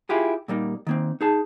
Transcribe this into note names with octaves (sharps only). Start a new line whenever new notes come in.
E4 F4 G4 G#4
A#2 G3 A#3 D#4
D#3 A#3 C4
D#4 G#4 A5